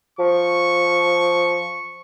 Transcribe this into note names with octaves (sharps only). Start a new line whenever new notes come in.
F3 C#6